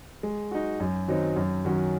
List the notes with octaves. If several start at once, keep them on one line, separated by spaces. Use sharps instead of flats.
G#3
D#4 F#4
F#2
D#3 F#3 C4 D#4
F#2
D#3 F#3 C#4 F#4